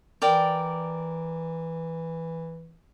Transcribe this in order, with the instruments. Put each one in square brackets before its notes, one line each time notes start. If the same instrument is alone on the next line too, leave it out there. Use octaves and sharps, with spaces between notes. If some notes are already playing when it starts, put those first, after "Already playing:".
[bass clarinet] E3 [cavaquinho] A#4 D5 G5